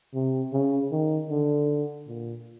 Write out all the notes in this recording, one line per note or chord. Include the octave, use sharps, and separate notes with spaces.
C3
C#3
D#3
D3
A#2